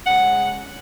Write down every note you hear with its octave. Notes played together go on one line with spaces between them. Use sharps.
C#3 G#3 F#5